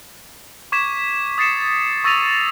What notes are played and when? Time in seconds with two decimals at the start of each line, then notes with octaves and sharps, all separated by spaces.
0.72 C#6 D6 G#6 B6 E7
1.38 D#6 A6 C7 C#7 E7
2.04 C#6 E6 A6 A#6 D#7 F7